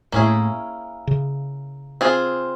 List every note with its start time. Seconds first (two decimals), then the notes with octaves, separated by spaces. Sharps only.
0.12 A2 A#3 C#4 E4 G#4
1.07 C#3
2.01 C4 F4 G#4